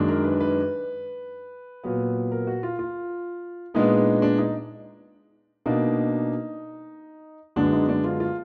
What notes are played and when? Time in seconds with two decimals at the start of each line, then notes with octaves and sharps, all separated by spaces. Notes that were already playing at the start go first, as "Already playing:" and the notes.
Already playing: F#2 D#3 G#3 D4
0.08 A#4
0.24 B4
0.40 B4
1.84 A#2 F#3 B3
2.32 A#4
2.47 F#4
2.63 F4
2.79 F4
3.74 A#2 G#3 B3 D4 D#4
4.22 D4
4.38 D#4
5.66 B2 A#3 D4 D#4
7.56 F#2 D3 G#3 B3 D4
7.73 D#4
7.89 D4
8.04 F4
8.20 F4